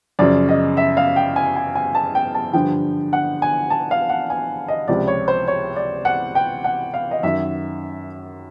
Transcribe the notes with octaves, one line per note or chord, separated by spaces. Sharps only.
F#2 C#3 F3 D5
D#5
E5
F5
G5
G#5
G#5
G#5
A5
G5
A5
G2 D3 F3 G5
F#5
G#5
A5
F5
F#5
G#5
D#5
C#2 C3 F3 D5
C#5
C5
C#5
D5
F#5
G5
F#5
F5
D#5
F#2 D#3 E5